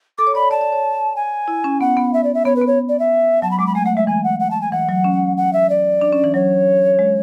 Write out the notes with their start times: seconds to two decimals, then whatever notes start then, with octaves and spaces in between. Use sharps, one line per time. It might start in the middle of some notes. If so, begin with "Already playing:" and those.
0.18 A4 D6
0.27 C#5
0.35 D5 B5
0.43 C#5
0.51 D5 A5
0.61 D5
0.72 C#5
1.16 G#5
1.48 E4
1.64 C#4
1.81 B3 F#5
1.97 B3
2.13 E5
2.24 D5
2.34 E5
2.45 B3 C#5
2.56 B4
2.62 B3
2.67 C#5
2.89 D5
2.99 E5
3.42 F#3 A5
3.51 B5
3.59 G#3 D6
3.66 B5
3.75 A3 G#5
3.85 A3 F#5
3.96 G#3 E5
4.07 E3 G#5
4.24 F#5
4.40 F#5
4.51 A5
4.61 G#5
4.72 E3 F#5
4.89 F#3
5.04 C#4
5.37 F#5
5.53 E5
5.70 D5
6.01 D4
6.13 C#4
6.24 E3
6.34 F#3 C#5
6.99 G#3